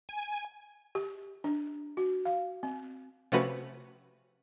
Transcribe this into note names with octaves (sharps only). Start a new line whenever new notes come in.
G#5
G4
D4
F#4
F5
C4
C3 F3 A3 C#4 F#4 B4